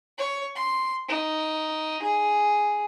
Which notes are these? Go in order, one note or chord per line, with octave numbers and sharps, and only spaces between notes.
C#5
C6
D#4
G#4